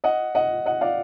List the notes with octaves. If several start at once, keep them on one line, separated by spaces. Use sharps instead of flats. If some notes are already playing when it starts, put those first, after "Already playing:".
D#5 F#5
D#5 F#5
D#5 F#5
D5 F5